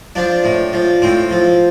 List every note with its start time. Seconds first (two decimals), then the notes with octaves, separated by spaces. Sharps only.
0.15 F3 D4
0.44 A2
0.73 F3
1.02 A2 C4
1.31 F3